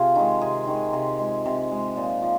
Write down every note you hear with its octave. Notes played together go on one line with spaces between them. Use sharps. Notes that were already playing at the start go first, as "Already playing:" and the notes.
Already playing: C3 F4 G#4
D#3 G#3
C3 G#4
D#3 G#3
C3
G#3
C3
G#3
A#2
F3